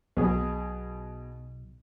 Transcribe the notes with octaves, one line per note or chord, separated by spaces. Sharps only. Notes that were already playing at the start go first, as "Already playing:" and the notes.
B1 B2 G#4